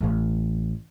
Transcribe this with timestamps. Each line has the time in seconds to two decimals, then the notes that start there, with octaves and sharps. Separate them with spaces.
0.01 A1 E3